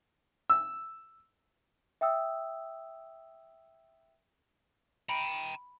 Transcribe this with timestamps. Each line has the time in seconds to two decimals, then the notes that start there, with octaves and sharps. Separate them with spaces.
0.50 E6
2.01 E5 G5 D#6 E6
5.09 G5 A#5 B5